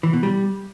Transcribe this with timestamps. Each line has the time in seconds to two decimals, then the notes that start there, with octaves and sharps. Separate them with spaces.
0.03 E3
0.13 B2
0.23 G3